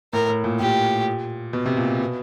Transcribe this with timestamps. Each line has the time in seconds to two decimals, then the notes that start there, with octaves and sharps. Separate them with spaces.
0.13 A2 A#4
0.29 A2
0.44 A#2
0.60 A#2 G4
1.53 B2
1.66 C3
1.77 A#2
2.00 B2